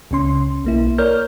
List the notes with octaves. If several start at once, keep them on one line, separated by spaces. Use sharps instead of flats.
C#2 C#3 C#4 C6
B1 A#3 E4
A#4 C#5 D5 F6 G6